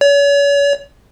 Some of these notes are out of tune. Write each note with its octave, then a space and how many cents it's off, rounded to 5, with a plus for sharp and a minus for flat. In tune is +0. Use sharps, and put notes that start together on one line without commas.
C#5 +40